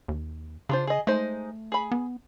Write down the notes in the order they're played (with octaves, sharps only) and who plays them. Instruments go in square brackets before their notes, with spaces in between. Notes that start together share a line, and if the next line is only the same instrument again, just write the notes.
[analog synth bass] D#2
[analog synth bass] C#3 [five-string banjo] D4 F4 C5
[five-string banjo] G#4 D#5
[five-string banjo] G#3 D#4 C5 [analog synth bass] A3
[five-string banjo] G#4 B5
[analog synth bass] B3